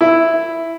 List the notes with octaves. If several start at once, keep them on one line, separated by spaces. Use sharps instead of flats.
E4